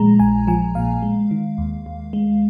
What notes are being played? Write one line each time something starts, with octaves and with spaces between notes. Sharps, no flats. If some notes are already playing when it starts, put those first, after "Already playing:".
Already playing: A#2 F3 G#3 A#5
A#1 G#5
F3 G#5
A#2 F5
G#3
D#3
D#2
D#2
G#3